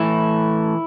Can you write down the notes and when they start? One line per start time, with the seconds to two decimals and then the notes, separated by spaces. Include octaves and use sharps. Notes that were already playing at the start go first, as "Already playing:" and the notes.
Already playing: A2 E3 E4